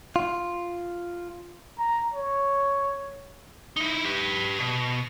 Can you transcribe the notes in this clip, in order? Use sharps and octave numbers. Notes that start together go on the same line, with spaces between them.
F4
A#5
C#5
D#4 E4
G4 B4
B2